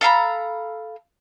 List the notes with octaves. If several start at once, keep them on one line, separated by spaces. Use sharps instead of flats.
A4 F5 A#5 B5